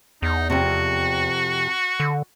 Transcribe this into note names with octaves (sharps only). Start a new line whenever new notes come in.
E2 D#4
F2 C3 F#4
D3